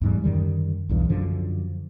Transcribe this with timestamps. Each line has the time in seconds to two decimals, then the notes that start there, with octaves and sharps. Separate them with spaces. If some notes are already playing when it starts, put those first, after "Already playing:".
0.01 E2 G#2 G3
0.24 F#2 D3 D#3 G3
0.89 B1 E2 G2
1.09 F#2 D3 F3